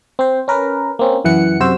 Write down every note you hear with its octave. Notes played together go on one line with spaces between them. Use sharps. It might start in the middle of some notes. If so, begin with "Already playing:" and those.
C4 C5
C#4 A#4 B4
A#3 C4 C#4
F#2 E3 F#5 C#7
F#2 C3 F#4 C5 E6